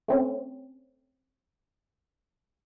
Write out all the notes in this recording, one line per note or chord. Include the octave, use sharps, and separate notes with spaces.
A3 C4 C#4